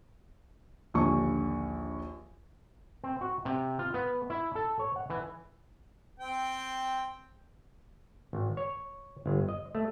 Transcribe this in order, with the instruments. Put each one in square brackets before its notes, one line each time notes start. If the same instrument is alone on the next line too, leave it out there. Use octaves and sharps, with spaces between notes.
[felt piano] A#1 D#2 D3 G#5 C#6
[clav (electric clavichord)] C4
F#4
C3
F4
B3
E4
A4
C#5
F#5
E3
[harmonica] C4 G5
[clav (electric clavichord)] G#1
C#5
G1
D#5
A3